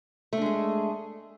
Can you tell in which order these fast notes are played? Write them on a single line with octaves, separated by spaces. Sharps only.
A3 D4 G#3 G#4